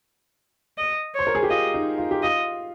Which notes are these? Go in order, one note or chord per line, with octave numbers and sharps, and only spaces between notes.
D#5
C5 C#5
A#4
G#4
G4
F4 D#5
D#4
F4
G4
F4 D#5